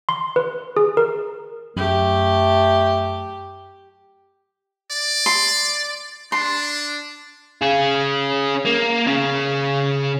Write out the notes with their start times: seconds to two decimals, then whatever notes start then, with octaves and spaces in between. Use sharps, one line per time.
0.09 C6
0.36 B4
0.77 G#4
0.97 A#4
1.77 F#2 A3 G4
4.91 D5
5.26 C6
6.32 D4 C6
7.62 C#4 G#4
8.66 A#3
9.07 C#3 C#4